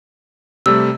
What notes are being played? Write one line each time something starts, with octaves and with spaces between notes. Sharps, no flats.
C3 G3 A3 E6